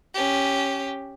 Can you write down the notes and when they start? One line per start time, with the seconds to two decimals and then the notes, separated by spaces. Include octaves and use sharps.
0.14 C#4 G4